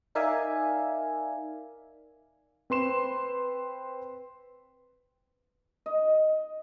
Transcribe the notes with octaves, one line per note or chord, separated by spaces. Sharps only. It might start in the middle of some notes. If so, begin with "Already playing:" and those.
D#4 A#4 D5 E5 F5 G#5
C4 B4 C6 E7
D#5